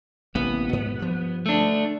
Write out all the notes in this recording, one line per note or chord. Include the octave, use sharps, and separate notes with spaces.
A1 C3 A#3 B3
G#2 B2
G2 F3
A3 D4